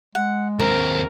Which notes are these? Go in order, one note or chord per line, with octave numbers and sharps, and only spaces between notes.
G#3 F#5
D#2 C4 A#4 A#5